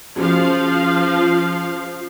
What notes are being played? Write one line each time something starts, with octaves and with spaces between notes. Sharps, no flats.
F3 C#4 F#4 G#4 F5